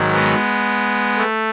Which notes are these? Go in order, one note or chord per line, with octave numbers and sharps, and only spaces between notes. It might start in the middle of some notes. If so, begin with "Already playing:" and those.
Already playing: G#2 D#3 F#3
G#3 B3
A3